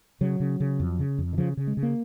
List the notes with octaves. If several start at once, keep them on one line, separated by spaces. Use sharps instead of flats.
C#3 F#3
C#3
C#3
F2
C#3
F2
D#3
C#3 F3
C#3
G#3
C#3
A#3